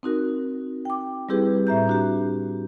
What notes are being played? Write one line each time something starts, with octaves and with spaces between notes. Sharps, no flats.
C4 D#4 F#4 A#4
G5 D6
G3 C4 E4 G4 G#4 B4
A2 E5 A#5 G6
D4 F#4 G4